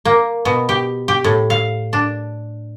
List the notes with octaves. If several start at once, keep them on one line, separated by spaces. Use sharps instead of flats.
A#3
B2
G4
G4
A2
F5
D4